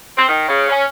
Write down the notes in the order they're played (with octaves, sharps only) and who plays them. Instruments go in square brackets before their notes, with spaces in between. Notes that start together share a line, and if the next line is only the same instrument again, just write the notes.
[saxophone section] C4
D#3
C#3
C#4